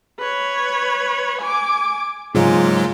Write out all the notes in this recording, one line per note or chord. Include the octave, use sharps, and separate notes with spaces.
B4 C#5
G#5 D6
G#2 C#3 F#3 G#3 A#3 F4 G#4